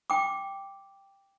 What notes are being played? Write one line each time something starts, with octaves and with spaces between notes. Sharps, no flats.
G5 D6